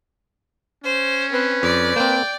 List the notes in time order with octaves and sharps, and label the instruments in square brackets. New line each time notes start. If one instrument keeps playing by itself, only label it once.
[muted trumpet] C#4 [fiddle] C5
[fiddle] C4 [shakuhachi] B4
[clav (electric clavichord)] F2 [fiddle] D5
[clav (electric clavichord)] A#3 C4 [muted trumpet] G5